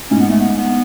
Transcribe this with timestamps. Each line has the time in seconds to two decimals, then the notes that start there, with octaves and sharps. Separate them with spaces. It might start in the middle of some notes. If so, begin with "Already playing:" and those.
0.11 G#2 C#4
0.20 B3
0.30 A3
0.40 B3
0.57 B3